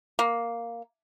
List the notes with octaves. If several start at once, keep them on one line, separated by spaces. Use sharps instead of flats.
A#3